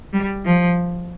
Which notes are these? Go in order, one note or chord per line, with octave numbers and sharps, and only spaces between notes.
G3
F3